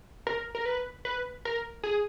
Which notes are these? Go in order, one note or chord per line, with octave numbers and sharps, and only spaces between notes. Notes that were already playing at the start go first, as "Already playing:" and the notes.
A#4
A#4
B4
B4
A#4
G#4